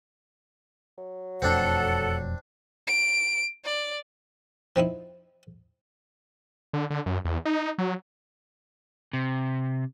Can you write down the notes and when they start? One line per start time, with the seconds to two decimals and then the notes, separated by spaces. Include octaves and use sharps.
0.98 F#3
1.42 E1 F2 A3 C4 D4 A4 F#5
2.87 D7
3.65 D5
4.76 F3 C4 D#4 E4
6.73 D3
6.90 D3
7.06 F#2
7.25 E2
7.45 D#4
7.78 F#3
9.13 C3